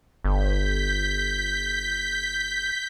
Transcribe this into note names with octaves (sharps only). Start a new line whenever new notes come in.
G1 G6 B6